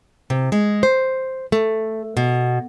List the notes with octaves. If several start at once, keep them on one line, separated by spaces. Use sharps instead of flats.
C3
G#3
C5
A3
B2